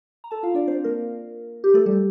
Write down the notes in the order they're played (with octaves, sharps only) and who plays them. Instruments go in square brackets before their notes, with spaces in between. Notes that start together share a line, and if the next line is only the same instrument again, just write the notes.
[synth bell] A#5
A4 A5
F4 F5
D4 D5
C4 C5
A#3 A#4
G4
A3 A4
G3 G4